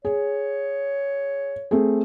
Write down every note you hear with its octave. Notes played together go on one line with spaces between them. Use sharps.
G#4 C#5
A3 C4 G#4